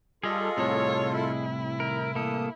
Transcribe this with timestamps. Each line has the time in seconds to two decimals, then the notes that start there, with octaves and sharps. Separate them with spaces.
0.23 G3 F4 G#4 A4 D#5
0.57 C2 A2 C3 C#5
1.15 E4
1.80 D#3 A#4
2.15 E3 A#3 A4 D#6